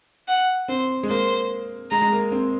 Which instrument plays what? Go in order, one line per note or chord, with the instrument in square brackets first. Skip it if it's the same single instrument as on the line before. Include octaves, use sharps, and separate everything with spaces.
[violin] F#5
[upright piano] C4 [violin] C5
[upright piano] G#3
[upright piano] A#3 [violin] C5
[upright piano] G#3 [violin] A#5
[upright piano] G#3
A#3
C4